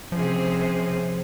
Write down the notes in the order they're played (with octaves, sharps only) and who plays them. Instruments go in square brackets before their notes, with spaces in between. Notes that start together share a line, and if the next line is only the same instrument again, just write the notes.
[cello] C3 G#4 [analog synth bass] F3 [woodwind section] C#4 C5